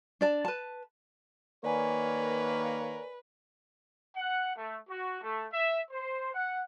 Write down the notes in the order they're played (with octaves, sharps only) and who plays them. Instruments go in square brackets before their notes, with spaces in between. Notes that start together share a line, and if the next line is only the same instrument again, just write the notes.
[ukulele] D4 D5 A5
B4 A5
[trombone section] D#3 A#3 [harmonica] A#4 C#5 [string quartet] B4 [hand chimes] D5 G#5
[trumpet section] F#5
A3
F#4
A3
E5
C5
F#5